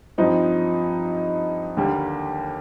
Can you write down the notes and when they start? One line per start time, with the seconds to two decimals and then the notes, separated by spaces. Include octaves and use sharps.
0.18 G2 F3 C4 D#4
1.77 D#2 D3 G3 A#3